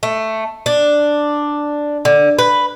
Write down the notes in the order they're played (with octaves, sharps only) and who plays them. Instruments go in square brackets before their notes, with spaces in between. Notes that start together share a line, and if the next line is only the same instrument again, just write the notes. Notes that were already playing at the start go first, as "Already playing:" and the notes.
[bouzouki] A3
D4
D3
B4